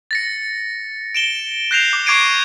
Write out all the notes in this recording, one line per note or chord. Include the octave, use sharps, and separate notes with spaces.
A6 A#6 C#7
D7 E7 G7
F#6 G6 A#6 C7 E7 F7
D6
C#6 D6 G#6 C7 D7 D#7